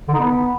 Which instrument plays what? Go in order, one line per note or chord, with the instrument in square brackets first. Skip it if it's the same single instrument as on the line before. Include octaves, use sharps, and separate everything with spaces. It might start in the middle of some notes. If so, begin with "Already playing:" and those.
[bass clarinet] D3
D#4
B3